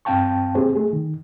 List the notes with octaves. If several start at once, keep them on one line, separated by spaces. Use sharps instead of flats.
G2 C4 F5 G5 A5 C#6
A#3 C4 G4 G#4 C5
A3 G#4
D#3